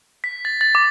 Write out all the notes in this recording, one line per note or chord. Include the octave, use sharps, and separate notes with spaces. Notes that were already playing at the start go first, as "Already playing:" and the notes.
B6
A6
A6
D6